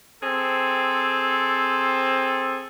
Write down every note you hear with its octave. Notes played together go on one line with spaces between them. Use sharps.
C4 G#4 A4